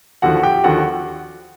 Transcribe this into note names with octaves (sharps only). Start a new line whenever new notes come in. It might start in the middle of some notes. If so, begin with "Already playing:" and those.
D#2 D3 F3 F#4 F#5
G4 G5
D#2 D3 F3 F#4 F#5